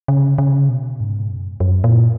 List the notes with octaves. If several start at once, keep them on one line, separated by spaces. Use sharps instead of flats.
C#3
C#3
B2
G#2
F#2
F#2
A#2